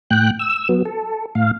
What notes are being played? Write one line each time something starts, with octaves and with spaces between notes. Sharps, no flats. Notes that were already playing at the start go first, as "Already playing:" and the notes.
A2 G5 F#6
E6
F#3 B3
A4
A2 F5